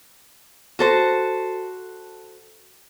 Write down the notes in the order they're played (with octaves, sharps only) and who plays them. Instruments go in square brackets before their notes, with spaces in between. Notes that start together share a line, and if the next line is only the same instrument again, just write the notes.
[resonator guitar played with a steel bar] F#4 A4 C5